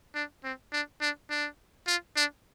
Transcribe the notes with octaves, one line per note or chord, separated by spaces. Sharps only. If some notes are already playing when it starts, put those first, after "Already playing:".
D4
C4
D4
D4
D4
F4
D4